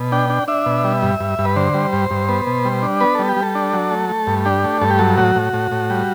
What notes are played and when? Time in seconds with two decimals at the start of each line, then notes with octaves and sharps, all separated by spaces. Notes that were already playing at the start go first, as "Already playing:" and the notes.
Already playing: B2
0.12 D4 G5
0.30 D4
0.48 D4 E5
0.66 B2
0.84 G3
1.02 G2
1.20 G2
1.39 G2
1.45 B4
1.56 D3 C5
1.74 G3
1.93 G2
2.11 G2
2.29 B3
2.47 B2
2.65 G3
2.83 D4
3.01 B3 B4
3.15 G3 A4
3.29 G4
3.37 G3
3.42 A4
3.55 D4
3.73 F#3
3.91 A3
4.09 A3
4.27 G2
4.45 D4 G4
4.64 A3
4.81 G2 A4
4.91 G4
4.99 F#3 A4
5.17 A2 F#4
5.36 A2
5.53 A2
5.71 A2
5.90 G3